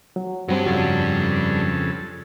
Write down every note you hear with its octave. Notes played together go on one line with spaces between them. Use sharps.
F#3
G2 F#3 G3 C4
F2 C#3 F#3 A4